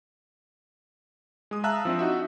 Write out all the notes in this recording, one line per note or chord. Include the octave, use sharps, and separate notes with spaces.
G#3 D#6
E5 F5 A5 A#5 E6 F#6
F3 C4 D4
D#4 F#4 E5